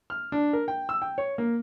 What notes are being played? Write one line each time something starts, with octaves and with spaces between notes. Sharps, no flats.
F6
D4
A#4
G5
E6
G5
C#5
A#3